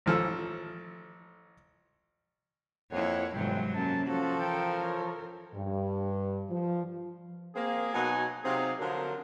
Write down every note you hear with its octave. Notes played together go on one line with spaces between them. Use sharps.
A1 F3 A4
F2 A#3 E4 C#5 F#5
G1 G#2 C3 E3 F#3 G5
F#2 A#3 C#4 A5
F3 C#4 F#4 A4
E3 A#4 G5
C#5
G2
F3
A#3 C4 G#4
B2 F#3 D#4 F#5 G#5
C3 F#3 C4 D#4 G#4 F5
D3 F3 F#3 A#4